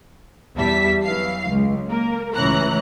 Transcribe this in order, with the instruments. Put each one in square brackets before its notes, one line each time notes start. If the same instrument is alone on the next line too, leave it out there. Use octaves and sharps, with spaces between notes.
[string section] E2 G3 E5 A5 B6
E3 F#3 F5 C7
C#2
A#3 A#4
C#2 A2 E3 C#4 A#5 F#6